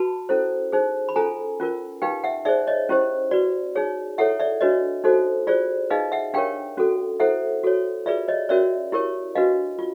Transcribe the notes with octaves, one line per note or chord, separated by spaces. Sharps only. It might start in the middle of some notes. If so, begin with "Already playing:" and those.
Already playing: F#4 B4 A5 B5
C#4 E4 A4 C5
D#4 G#4 C5
B5
C#4 F4 A4 G#5 A#5
C#4 F4 A#4
D#4 G4 B4 F5 G5
E5 F#5
D#4 G#4 C5 D5 E5
C#5 D#5
C#4 E4 G4 C5
F#4 B4 D5
D#4 G#4 C#5
E4 A4 C#5 E5 F#5
D5 E5
D4 F#4 B4 C#5 D#5
D#4 F#4 A4 C5
F4 G#4 C5 D5
D#4 G#4 B4 D#5 F5
E5 F#5
D4 G4 A#4 C#5 F5 G5
C#4 F#4 A4
E4 A4 C5 E5 F#5
F#4 A4 C#5
F4 G#4 B4 D5 E5
C#5 D#5
C#4 F#4 A#4 C#5 D5 E5
E4 G4 A#4 C#5
D4 F#4 B4 D#5 F5
F4